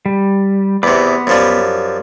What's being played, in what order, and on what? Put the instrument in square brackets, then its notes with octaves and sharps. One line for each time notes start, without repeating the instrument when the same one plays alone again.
[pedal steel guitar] G3
[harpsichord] E2 C3 [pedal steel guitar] B3 B5 D6
[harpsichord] F#2 F3 G3